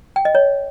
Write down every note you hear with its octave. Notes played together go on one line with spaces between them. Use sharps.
G5
D#5
C#5